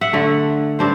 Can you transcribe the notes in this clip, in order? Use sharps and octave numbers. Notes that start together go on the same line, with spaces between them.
E5 F#5
D3 A3
G2 D4 C5